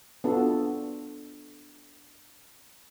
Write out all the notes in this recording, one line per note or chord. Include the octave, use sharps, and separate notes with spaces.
B3 D4 F4 F#4 A4